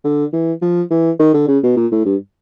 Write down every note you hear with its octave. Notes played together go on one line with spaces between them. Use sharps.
D3
E3
F3
E3
D#3
D3
C#3
B2
A#2
A2
G2